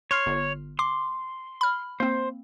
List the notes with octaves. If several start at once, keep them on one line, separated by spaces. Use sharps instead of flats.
C#5 C6 F6 C7
G1
C6 D6
B5 F6
A#3 C4 C5